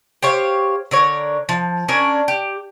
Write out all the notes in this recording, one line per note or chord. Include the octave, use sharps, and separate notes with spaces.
G4 C5 C#5 F5
D3 A#4 C#5
F3
C#4 D4 A#4 C#5
G4